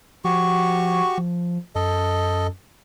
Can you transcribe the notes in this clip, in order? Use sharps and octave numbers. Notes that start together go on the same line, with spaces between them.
F3 F#4 G4 C#6
F3
F#2 A4 D#5